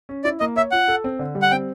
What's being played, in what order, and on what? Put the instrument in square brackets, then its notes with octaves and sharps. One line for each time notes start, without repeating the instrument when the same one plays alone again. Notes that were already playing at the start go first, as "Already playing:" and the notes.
[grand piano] C#4
[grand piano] E4 [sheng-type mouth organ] D5
[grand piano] A#3 [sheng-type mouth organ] D#5
[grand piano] C#5 [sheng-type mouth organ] E5
[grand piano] F4 [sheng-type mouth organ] F#5
[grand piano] A4
C4
D3
G3
[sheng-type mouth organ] F#5
[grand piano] C4 [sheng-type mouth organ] G5